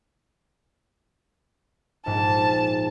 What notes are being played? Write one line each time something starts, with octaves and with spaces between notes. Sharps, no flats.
A#1 G#2 A5